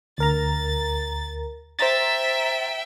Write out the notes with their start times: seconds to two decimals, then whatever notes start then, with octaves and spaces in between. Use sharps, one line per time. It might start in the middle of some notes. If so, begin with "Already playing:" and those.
0.18 D2 A#4 A#5 A6
1.79 C5 E5 G5 A#5 A6